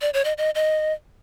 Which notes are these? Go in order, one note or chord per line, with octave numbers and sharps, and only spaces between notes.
D5
C#5
D#5
D#5
D#5